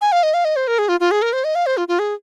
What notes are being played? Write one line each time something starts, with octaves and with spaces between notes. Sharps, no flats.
G#5
F5
D#5
F5
D#5
C5
A#4
G#4
F4
F4
G#4
A#4
C5
D#5
F5
C5
F4
F4
G#4